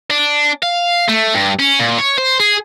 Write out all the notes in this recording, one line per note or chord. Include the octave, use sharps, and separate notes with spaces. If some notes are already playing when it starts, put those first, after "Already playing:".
D4
F5
A3
G2
C#4
A#2
C#5
C5
G#4